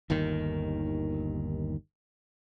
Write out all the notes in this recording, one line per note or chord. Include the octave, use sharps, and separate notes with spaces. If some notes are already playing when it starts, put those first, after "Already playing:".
G1 D#2 D#3